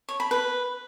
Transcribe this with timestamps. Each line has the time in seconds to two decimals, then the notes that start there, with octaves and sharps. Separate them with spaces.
0.09 C#5
0.20 B5
0.31 B4